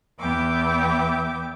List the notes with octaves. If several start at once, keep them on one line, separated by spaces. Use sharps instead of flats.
E2 B3 E5 G5 D6